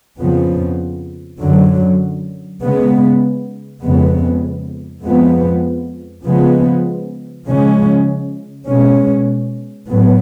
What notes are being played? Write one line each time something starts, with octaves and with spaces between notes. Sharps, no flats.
F2 C#3 F3 B3
F#2 D3 F#3
C#3 G#3 B3
F2 C#3 G#3 B3
F2 F3 G#3 B3
C#3 F3 G#3 B3
C#3 F3 G#3 C#4
B2 G#3 C#4
A2 F#3 B3